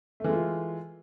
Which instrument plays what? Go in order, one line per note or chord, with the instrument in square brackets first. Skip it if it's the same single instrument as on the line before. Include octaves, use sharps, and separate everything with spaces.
[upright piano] A3
E3
G#3
F4